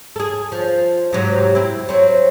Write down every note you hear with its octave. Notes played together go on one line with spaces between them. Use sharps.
G#4 A4
F3
G#2 C3 F#3
C4 E4
F#3 C4